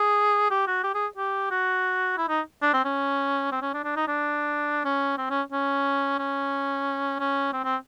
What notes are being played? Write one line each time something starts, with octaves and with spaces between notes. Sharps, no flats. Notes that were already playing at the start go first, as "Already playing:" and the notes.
Already playing: G#4
G4
F#4
G4
G#4
G4
F#4
E4
D#4
D4
C4
C#4
C4
C#4
D4
D4
D#4
D4
C#4
C4
C#4
C#4
C#4
C#4
C4
C4